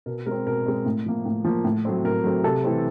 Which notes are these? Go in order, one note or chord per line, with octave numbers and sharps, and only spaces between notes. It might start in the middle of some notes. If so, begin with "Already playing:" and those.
B2 A#4
G#3 C4 A#4
B2 A#4
G#3 C4
A2
F3 A#3
A2
F3 A#3
A2
F#3 A3 C4
A2 A#4
F#3 A3 C4
C3 A4
E3 A3 C4